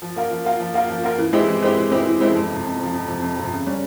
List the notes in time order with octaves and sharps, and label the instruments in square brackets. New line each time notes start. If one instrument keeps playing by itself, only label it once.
[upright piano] F3
A#3 F4 A#4
F3
A#3 F4 A#4
F3
A#3 F4 A#4
F3
A#3 F4 A#4
E3
G#3 C4 E4 G4
E3
G#3 C4 E4 G4
E3
G#3 C4 E4 G4
E3
G#3 C4 E4 G4
F2
C3 F3
F2
C3 F3
F2
C3 F3
F2
C3 F3
C#3
G3 C#4